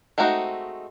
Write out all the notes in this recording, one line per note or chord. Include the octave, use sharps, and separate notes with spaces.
G#3 A3 C4 D#4 F#4